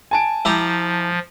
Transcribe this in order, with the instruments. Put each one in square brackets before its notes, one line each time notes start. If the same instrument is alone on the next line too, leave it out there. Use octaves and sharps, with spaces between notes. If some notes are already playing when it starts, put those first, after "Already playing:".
[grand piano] G#5 A5 D7
[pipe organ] F3 [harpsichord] E4 G4 A#5